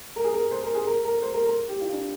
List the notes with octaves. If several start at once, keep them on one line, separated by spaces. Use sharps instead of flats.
A#4
G#4
A#4
C5
A#4
G#4
A#4
A#4
C5
A#4
A#4
G4
F4
D4